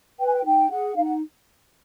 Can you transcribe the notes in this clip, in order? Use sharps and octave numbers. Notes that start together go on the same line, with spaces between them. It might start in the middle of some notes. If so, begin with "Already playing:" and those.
B4 G5
G#5
G5
D#4 G5
G#4 F#5
D#4 F5
F#5